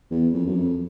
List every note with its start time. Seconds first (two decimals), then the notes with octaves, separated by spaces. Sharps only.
0.11 E2
0.33 F2
0.46 F#2
0.55 F2